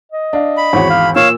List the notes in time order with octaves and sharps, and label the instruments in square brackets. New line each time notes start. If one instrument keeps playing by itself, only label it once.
[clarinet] D#5
[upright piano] D4 F5
[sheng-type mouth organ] B5
[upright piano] G#1 E2 F#4 [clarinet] C#5
[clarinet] F5
[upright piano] A#2 [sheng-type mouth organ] C#5 F5 [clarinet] E6